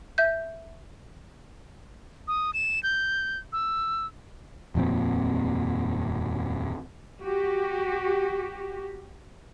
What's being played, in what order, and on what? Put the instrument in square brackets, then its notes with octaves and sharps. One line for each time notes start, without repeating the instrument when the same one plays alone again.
[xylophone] E5 G6
[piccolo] D#6
E7
G6
E6
[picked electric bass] D#1 F2 A#2 C4
[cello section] F#4 G4